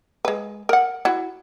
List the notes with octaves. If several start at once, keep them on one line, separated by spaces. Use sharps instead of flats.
G#3 B4
A#4 F#5
E4 F#4